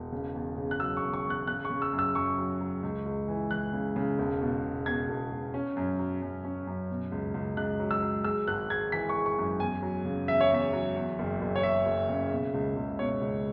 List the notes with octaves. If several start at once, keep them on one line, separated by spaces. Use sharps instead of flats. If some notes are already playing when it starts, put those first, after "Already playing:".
Already playing: E1
C#3
E2
C#3
F#6
F#3 E6
C#6
E1
C#6
E2
F#6
C#3 F#6
C#6
C#3
E6
F#2
E6
F#2 C#6
F#3
F#3
C#2
C#2
E3
E3 F#6
C#3
C#3
E1
B2
B2
B2 G#6
E1
E1
C#4
F#2
F#3
F#2
C#4
F#2
B2
C#2
C#2
C#2 F#6
F#3
E6
F#3
G#3 E6
G#1 F#6
G#3 G#6
E3 B6
C#6
G#3
C#6
F#2
E2 G#5
F#3
C#3
E2 E5
C#5
E2 E5
F#3
E2
F#1
F#1
C#5
F#1 E5
F#1
C#3
B2
C#2
C#2
B2 C#5
C#2